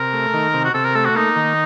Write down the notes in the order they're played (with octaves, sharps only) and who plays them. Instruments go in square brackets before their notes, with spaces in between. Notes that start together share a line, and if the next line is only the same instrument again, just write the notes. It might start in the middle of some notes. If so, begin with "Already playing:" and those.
Already playing: [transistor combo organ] C3 [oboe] A#4
[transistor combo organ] A3
D#3
C3
[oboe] F#4
[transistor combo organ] C3 [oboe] A4
[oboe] A#4
[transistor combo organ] A3 [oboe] A4
[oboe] F#4
[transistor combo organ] A#3 [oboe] D#4
[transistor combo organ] D#3